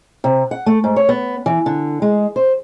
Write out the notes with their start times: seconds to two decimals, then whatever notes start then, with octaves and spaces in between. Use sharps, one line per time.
0.24 C3
0.51 F#5
0.66 A3
0.84 G#2
0.96 C#5
1.09 B3
1.46 E3
1.66 D3
2.02 G#3
2.36 C5